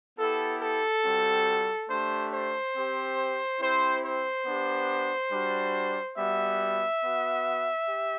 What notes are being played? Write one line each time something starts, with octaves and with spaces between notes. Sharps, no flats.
B3 E4 G4 A4
A4
G3 C4 F#4
A3 D4 G4 C5
C5
C4 G4
C4 E4 G4 C5
C5
B3 D4 G4
G3 D4 F#4
G3 B3 F#4 E5
B3 F#4
G4